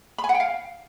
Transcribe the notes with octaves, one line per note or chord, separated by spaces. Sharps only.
B5
G#5
F#5
G5
F5